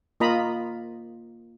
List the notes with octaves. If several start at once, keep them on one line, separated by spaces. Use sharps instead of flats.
A#3 F4 D#5 A#5 B5